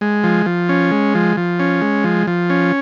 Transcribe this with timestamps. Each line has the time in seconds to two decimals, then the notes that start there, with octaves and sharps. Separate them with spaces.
0.01 G#3
0.24 F3
0.46 F3
0.69 C#4
0.91 G#3
1.15 F3
1.37 F3
1.60 C#4
1.82 G#3
2.04 F3
2.27 F3
2.50 C#4